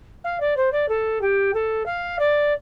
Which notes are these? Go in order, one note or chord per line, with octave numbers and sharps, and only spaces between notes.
F5
D5
C5
D5
A4
G4
A4
F5
D5